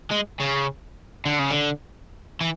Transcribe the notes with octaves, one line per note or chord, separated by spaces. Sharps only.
G#3
C#3
D3
C#3
D3
E3